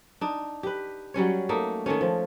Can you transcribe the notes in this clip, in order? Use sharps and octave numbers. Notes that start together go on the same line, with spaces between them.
D4 D#4
G4 B4
F#3 G3 C#4 C#5
A3 A#3 D#4
D#3 G#3 A3 C#4
F3